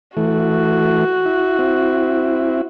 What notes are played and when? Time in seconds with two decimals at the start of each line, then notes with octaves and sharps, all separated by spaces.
0.17 E3 A3 F#4
1.25 E4
1.59 C4 E4